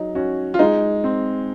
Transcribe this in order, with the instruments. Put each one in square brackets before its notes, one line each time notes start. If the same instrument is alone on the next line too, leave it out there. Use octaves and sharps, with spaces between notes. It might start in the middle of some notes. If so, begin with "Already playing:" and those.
Already playing: [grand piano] F#3 [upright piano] D#4
[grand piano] C#4 F#4
[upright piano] F4
[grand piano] G#3 [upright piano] D#4
[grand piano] C4